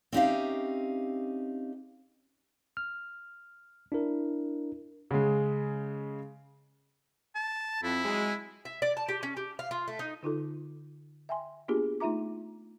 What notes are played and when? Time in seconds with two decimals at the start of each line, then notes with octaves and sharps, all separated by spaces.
0.13 C4 C#4 D#4 G4 E5 F5
2.77 F6
3.92 D4 E4 A#4
5.11 C#3 G#3
7.35 A5
7.83 F2 E4
8.05 F#3 G#3
8.65 E5
8.82 D5
8.97 A5
9.09 G4
9.23 C#4
9.37 G4
9.59 F5
9.71 F4
9.88 A3
9.99 D#4
10.23 D3 D#4 F4 A4
11.29 E5 G5 G#5 C6
11.68 A#3 B3 D4 F4 G4 G#4
12.00 A3 D#4 F4 E5 A#5 D6